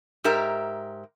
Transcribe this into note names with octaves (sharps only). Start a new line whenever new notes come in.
G#2 G4 A#4 E5 A#5